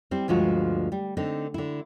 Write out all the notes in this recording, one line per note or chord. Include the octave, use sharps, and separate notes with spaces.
G3 C4 E4
D2 G2 F3 G#3 F4 F#4
G3
D3 C4 D#4
D3 E4